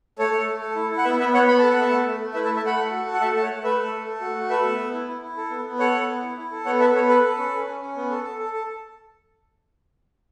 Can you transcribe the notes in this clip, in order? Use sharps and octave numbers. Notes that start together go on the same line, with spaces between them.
A3 A4 C#5
A3
A3
A4
E4
E4
F#5
B3 B4 E5
B3 B4 E5
B3 C#5 F#5
B3 B5
A4 A5
F#5
B3 E5 A5
A3
A3
A3
E4 B4 E5
E5 A5
A3
E5 A5
A3 F#5 B5
A4
F#4
A4
F#5
A3 E5 A5
A3 A5
C#5 F#5
A3
A3 B4 E5
A4
A3
A4
F#4
A3
A4 B4 E5
B3
B3
E4
E4
E4
A4
B3
B3
A4 C#5 F#5
B3
B3
E4
E4
A4
B3 C#5 F#5
A4 B4 E5
B3 A4 C#5
A4 B4
A4
C#4
C#4
C#4
C#4
B3
A4
A4
A4
A4